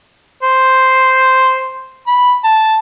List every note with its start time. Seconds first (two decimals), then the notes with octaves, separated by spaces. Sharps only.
0.43 C5
2.07 B5
2.44 A5